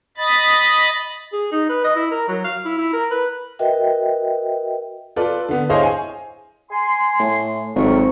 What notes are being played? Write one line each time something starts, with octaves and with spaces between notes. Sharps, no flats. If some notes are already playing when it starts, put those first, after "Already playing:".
D#5 B5 A6
G#4
D#4
B4
D#5
E4
A#4
F#3
F5
E4
E4
A#4
B4
F#4 A#4 B4 D#5 E5 G5
F4 A4 B4 D5
D3 B3
E4 G#4 C5 C#5 D#5 F5
G#5
G#5 C6
A2
G#1 F2 F#3 C#6